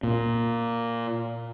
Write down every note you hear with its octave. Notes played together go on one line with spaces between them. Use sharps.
A#2